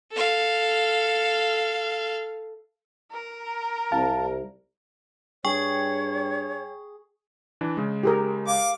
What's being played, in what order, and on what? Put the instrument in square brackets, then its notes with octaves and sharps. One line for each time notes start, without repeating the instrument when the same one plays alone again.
[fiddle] A4 F5
[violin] A#4
[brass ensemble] C2 [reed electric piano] F5 A5
[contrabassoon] G2 [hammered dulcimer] G#4 [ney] C#5 [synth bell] G5 C#6
[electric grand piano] E3 D4
C#3 G#3
[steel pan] G4 G#4 A#4
[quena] F5 [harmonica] D6